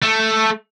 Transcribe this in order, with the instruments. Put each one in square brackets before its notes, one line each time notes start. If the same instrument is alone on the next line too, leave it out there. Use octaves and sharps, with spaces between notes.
[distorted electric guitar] A3